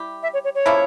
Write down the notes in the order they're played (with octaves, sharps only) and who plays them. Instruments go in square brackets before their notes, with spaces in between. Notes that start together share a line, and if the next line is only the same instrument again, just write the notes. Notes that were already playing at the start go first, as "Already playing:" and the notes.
Already playing: [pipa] G3 E4 G4
[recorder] E5
C#5
C#5
C#5
[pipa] C#3 F3 A#3 E4